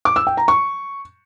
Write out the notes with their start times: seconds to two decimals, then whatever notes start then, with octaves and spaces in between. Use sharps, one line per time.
0.05 D6
0.16 E6
0.27 G5
0.37 A#5
0.48 C#6